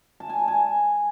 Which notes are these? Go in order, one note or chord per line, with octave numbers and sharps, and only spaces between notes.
A5
G#5
A5
G#5